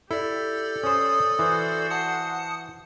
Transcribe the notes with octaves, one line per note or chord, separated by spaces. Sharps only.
E4 G4 A4 D5
C#4 C5 D#6
E3 F#4 C5
F#5 A5 D#6 C#7